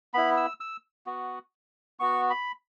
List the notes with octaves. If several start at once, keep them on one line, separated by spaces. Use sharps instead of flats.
B3 E4 B5
E6
E6
B3 F#4
B3 F#4 C#6
B5